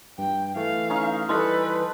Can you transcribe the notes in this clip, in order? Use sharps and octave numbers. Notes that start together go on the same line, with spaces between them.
G2 G5
E3 A3 F5
C#4 D#4 C#6
E3 G3 A4 B4 D#5 C6